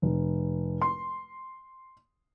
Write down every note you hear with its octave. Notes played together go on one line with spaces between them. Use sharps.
F1
C6